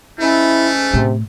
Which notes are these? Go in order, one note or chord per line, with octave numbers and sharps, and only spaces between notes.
G#2 A3 C#4 E4
A2 C3